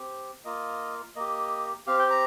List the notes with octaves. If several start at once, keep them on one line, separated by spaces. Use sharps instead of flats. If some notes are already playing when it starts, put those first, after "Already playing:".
Already playing: C4 G4
A#3 F4 D#5
A#3 G4 D#5
C4 G4 F5
G5
A#5